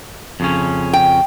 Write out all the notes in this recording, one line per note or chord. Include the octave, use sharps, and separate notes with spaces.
F2 C#3 C#4
G5